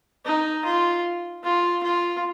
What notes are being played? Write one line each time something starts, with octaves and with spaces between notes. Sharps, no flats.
D#4
F4
F4
F4